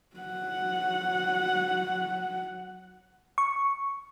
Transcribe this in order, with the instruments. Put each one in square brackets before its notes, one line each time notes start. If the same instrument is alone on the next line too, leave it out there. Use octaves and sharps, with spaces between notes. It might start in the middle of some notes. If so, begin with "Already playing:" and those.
[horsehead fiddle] F#3 F#5
[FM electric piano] C#6